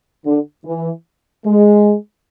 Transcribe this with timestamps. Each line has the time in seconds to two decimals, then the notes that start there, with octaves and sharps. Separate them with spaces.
0.25 D3
0.65 E3
1.46 G#3